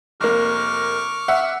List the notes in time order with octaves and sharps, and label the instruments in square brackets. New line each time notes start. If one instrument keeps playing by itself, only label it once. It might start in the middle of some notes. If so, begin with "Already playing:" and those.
[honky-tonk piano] F1 A#3 [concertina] C#6 D6 F6
[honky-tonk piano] E5 F#5